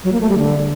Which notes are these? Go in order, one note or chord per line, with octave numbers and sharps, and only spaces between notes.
F#3
A#3
A3
G3
D3